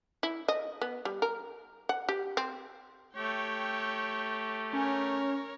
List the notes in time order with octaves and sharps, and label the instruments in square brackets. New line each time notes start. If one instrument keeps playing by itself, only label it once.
[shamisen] E4
D#5
B3
G3
A#4
F#5
G4
C4
[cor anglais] A3 [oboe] G4 [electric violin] C#5 G5
[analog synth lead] C#4 [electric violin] A#4 C#5